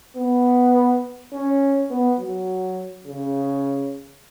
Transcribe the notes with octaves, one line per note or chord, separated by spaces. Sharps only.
B3
C#4
B3
F#3
C#3